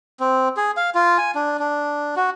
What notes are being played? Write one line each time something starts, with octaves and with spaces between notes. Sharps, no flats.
C4
G#4
F5
F4
G#5
D4
D4
F#4